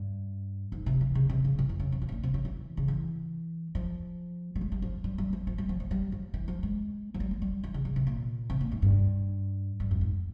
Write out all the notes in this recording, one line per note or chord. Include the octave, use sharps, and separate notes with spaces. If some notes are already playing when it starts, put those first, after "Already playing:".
Already playing: G2
G#2
C3
E3
C#3
C3
C#3
E3
F2
C#3
C3
C#3
C3
A#2
C3
C#3
E3
C#3
E3
F3
G3
G#3
G3
F3
G3
G3
F3
F3
G3
F3
F3
G3
F3
E3
F3
G#3
F3
G3
G#3
G3
E3
C#3
C#3
C3
A#2
C3
A#2
G#2
G2
G2
F2
G#2